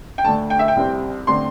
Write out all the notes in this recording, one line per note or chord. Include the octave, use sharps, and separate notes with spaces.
G5
D2 D3 A3 A5
G5
E5
G5
C2 C3 G3 C4
D3 A3 C4 C6